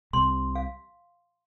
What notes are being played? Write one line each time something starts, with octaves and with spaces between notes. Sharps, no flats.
C2 C3 C6
F5